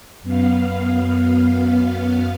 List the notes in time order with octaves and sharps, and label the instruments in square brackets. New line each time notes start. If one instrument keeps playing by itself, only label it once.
[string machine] F#2 B3 F5